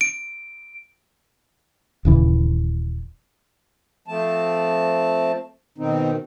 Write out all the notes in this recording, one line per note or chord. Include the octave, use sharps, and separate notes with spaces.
D7
D#1 C#3 E3
F3 A3 C4 A5
B2 D#3 C4 D#4